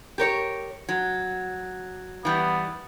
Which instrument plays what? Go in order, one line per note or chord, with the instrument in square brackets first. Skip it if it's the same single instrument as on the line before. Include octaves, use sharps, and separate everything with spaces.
[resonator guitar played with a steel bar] G4 A#4 C#5
F#3
[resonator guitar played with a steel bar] E3 G3 [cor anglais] B3